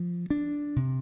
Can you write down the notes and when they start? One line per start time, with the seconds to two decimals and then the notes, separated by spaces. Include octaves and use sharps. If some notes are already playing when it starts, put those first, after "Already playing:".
Already playing: F3
0.30 D4
0.76 C3